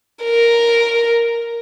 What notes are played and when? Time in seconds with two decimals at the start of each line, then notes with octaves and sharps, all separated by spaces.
0.24 A#4